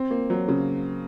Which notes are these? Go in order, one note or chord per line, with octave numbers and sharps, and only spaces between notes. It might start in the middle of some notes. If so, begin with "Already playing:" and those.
Already playing: C4
A#3
F#3
C#3